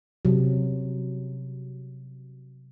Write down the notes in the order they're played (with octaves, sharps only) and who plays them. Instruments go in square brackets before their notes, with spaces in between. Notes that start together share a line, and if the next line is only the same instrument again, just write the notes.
[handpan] C3 F#3